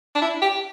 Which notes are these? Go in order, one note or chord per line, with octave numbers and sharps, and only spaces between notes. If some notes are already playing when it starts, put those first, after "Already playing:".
D4
E4
G4